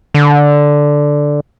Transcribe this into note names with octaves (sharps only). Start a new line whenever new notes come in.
D3